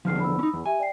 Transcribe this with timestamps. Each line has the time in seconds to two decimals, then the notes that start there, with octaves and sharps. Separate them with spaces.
0.05 E2 D3 F3 D4 F6 C7
0.20 B5 E6
0.39 C#4 D#4
0.54 E2
0.66 G4 E5 G#5
0.79 D5 G5 C7